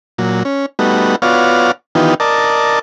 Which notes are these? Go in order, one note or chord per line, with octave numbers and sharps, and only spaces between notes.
A#2 F#3
C#4
G3 A3 B3 D#4 F#4
B3 F4 F#4 C#5 D5 F5
D#3 E3 B3 D#4 F4 G4
A#4 D5 D#5 A5